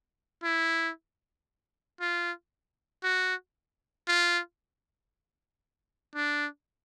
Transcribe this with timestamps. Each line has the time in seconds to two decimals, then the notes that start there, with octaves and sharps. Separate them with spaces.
0.44 E4
2.00 F4
3.04 F#4
4.08 F4
6.15 D4